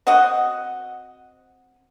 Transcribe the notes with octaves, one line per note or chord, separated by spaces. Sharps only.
C4 F#4 D#5 F#5